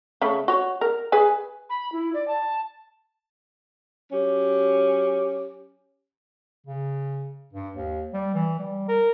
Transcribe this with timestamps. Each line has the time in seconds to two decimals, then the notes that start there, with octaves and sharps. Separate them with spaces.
0.21 C#3 A3 B5
0.48 F#4 C#5
0.81 A#4
1.12 G#4 B4 G#5
1.70 B5
1.92 E4
2.14 D5
2.28 A5
4.12 F#3 C#4 G4
6.67 C#3
7.53 G2
7.76 D#2
8.14 G3
8.35 E3
8.59 G3
8.88 A#4